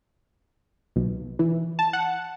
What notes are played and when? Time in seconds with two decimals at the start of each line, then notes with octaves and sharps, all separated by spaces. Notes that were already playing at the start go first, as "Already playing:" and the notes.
0.96 B1
1.39 E3
1.79 A5
1.93 F#5